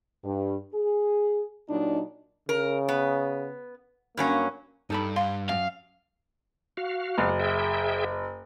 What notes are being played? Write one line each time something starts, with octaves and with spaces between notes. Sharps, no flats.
G2
G#4
A#2 F#3 D4 D#4
C#3 A#4
B3
G2 F#3 A#3 C#4
G2 D#4 A4 B5
F5 C6
F#2 F5
F#4 F5
F#1
G#4 E5 G5